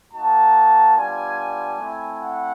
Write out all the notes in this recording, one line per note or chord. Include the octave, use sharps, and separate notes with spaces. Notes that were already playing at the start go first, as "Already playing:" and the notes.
A#3 D#4 F#4 A5
G3 B3 D4 F4 G#5
A3 C4 E4
F#5